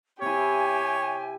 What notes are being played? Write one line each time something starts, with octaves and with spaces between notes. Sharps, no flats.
C3 E4 G4 C#5 G#5